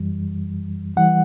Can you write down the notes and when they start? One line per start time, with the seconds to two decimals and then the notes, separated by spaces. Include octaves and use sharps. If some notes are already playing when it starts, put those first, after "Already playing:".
Already playing: F#2 E3 G3
0.97 E3 G3 F#5